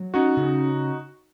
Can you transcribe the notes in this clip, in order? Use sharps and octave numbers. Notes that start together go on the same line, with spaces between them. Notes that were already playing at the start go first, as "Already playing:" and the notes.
Already playing: F#3
C#4 D#4 F#4
C#3